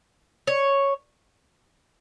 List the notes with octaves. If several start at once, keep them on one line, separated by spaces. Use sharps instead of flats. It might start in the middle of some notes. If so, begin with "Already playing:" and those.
C#5